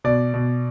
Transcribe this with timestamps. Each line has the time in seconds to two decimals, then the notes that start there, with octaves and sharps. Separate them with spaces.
0.04 B2 D5
0.34 B2